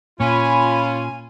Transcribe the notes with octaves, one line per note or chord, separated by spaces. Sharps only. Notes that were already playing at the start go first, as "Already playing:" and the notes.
A#2 C#4 F4 G#5 B5